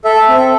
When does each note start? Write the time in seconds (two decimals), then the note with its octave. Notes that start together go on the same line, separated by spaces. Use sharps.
0.04 A4 E5
0.28 C4 E5